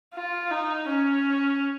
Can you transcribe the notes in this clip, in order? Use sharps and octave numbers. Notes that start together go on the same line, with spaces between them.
F4
D#4
C#4